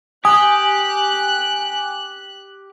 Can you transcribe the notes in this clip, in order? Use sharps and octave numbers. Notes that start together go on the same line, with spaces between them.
G4 G#5 D#6 F#6